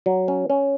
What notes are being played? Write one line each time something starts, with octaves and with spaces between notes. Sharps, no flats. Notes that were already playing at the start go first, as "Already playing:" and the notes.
F#3
C#4
C#4